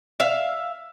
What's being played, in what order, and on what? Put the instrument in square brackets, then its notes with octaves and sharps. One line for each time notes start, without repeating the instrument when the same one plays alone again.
[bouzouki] E5 F5